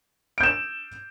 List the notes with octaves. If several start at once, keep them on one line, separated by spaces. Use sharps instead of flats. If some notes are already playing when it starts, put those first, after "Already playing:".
G6 D7 E7